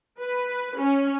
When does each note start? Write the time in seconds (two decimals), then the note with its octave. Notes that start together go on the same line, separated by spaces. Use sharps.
0.22 B4
0.79 C#4